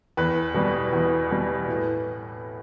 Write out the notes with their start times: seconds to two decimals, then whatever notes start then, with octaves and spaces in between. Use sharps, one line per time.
0.17 E2 B4
0.54 B2 G3
0.93 E2
1.31 B2 G3
1.68 A2